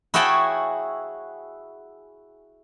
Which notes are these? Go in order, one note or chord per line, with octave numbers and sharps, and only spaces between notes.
E4 F#4 G#4 C#5 G5 A5